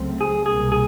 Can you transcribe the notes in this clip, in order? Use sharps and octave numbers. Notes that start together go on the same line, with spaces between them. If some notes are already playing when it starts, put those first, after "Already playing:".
Already playing: C#2 C#3 F#3 A3 C4
G#4
C2 B2 G3 A#3 G#4
G#4